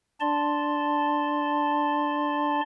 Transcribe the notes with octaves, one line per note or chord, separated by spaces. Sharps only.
D4 D5 A5 C6